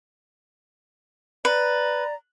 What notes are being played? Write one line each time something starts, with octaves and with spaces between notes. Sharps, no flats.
B4 D5 A#5